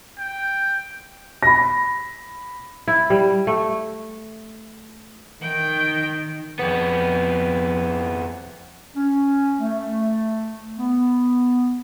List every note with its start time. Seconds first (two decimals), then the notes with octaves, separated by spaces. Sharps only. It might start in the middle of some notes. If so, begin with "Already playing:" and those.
0.19 G5
1.43 B5 A#6
2.88 E4
3.10 G3
3.47 A3
5.41 D#3 G5
6.59 F2 B3
8.95 C#4
9.59 A3
10.77 B3